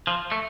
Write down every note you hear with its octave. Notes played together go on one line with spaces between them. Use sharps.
F3
A3